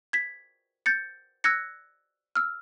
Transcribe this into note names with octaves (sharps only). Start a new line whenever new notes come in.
G#6 B6
G6 A6 C#7
E6 F#6 G#6 A#6 C#7
E6 F6